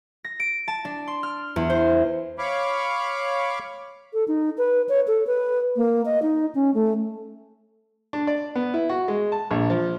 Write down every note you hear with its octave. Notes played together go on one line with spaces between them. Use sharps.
A#6
D7
A5
D4
C6
F6
E2
C5
C#5 F5 B5 C#6 D6
A4
D#4
B4
C#5
A4
B4
A#3
D#5
D#4
C#4
A3
D4
D5
B3
E4
F#4
G#3
A5
A#1
F3